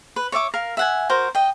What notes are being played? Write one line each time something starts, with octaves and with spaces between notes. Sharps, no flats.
B4
C#5 D5 E5 D6
A#4 F5
E5 F#5 G#5
F#4 A#4 C5
D#5 G5